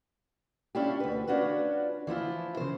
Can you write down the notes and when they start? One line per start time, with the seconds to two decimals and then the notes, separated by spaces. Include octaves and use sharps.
0.75 C#4 D4 E4 F4 G4
1.00 D2 B4
1.27 C#4 D4 F4 F#4 B4
2.07 E3 F3 E4 F4
2.57 C#3 C5